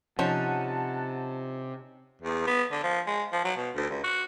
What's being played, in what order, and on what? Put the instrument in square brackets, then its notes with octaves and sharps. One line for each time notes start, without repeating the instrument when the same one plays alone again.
[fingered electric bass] C3 [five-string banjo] F3 [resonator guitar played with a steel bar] C#4 D#4 [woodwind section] F#5 A5
[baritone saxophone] E2
B3
D3
F3
G#3
F3
F#3
B2
D2
C#2
F#4